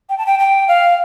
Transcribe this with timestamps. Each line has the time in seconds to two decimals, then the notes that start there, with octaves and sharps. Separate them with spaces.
0.09 G5
0.18 A5
0.26 G5
0.39 G5
0.68 F5